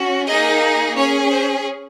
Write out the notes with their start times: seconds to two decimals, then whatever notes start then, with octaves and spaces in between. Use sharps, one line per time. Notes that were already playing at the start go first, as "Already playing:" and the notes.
Already playing: C#4 F#4
0.26 A#3 D#4 G#4 D#5
0.96 C#4 G#4 C#5
1.31 C5